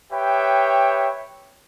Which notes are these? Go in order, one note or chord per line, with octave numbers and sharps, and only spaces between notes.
G4 B4 C#5 E5 G5